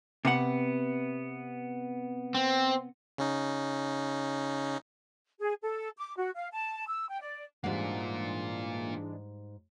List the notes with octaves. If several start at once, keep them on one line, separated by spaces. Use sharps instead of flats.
C3 B3 F#5
C4
C#3 C#4 D#4
G#4
A4
D6
F#4
F5
A5
E6
G5
D5
G#2 E3 G3 G#3 A#3 D4 F4 F#5